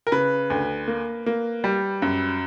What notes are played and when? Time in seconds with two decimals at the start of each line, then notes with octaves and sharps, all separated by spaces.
0.07 A#4
0.12 C#3 B4
0.50 D2
0.88 A#3
1.26 A#3
1.64 G3
2.02 F#2